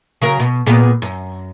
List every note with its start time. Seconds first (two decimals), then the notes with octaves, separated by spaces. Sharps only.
0.22 C#3 F#3 A#4
0.40 B2
0.66 A#2 G#3 B3
1.02 F#2